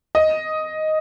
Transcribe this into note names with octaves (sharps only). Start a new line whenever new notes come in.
D#5